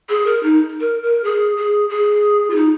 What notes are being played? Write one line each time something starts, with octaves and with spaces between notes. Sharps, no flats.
G#4
A#4
D#4
A#4
A#4
G#4
G#4
G#4
F4
D#4